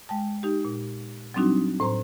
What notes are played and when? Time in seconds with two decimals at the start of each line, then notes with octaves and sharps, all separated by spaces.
0.09 G#3 G5 A5
0.43 D#4 G4
0.65 A#2
1.34 F#3 G3 C4 D4 D#4 F#4
1.80 A2 C5 A#5 C6